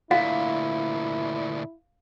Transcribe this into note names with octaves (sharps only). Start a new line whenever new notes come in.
D2 A#2 E4 F5